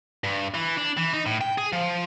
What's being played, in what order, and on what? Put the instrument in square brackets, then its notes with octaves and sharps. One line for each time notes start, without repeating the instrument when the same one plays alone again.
[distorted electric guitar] G2
E3
D4
E3
D#4
A2
G5
G#4
F3